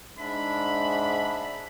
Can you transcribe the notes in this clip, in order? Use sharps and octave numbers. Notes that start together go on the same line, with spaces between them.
G#2 D4 E5 B5